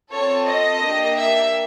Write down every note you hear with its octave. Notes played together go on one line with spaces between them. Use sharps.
C4 F4 A4 C#5
D#5
A#3 D4 G4
E5